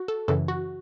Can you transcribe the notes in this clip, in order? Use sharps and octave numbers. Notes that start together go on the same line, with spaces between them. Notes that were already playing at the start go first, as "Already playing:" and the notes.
Already playing: F#4
A4
F#2 C#3 E3 A4
F#4